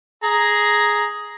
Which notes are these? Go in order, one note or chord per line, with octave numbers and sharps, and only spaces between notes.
G#4 A#5